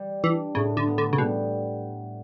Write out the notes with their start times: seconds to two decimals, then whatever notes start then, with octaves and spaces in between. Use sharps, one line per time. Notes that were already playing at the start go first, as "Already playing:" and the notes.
Already playing: G3
0.24 E3 D4
0.55 A2 C#3
0.77 D3
0.87 B3
0.98 D3
1.13 C#3
1.18 B2 G3